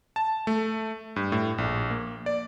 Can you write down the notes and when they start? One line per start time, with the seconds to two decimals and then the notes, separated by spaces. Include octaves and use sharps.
0.16 A5
0.47 A3
1.16 G2
1.32 A2
1.58 A#1
1.90 A#3
2.26 D5